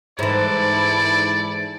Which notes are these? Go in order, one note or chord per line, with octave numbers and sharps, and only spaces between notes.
G#2 E3 E4 A4 D5